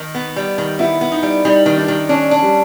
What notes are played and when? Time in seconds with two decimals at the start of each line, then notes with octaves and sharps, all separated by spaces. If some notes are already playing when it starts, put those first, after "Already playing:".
Already playing: D#3 D#4
0.15 B3
0.36 G3
0.58 D#3
0.79 B3 E4
1.01 B3
1.12 D#4
1.23 G3
1.45 G3 D#4
1.66 D#3
1.77 D4
1.88 D#3
2.09 C#4 D4
2.31 D4
2.43 G3